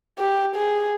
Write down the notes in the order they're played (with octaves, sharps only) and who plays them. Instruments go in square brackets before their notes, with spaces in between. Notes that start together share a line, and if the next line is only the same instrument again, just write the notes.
[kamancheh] G4
G#4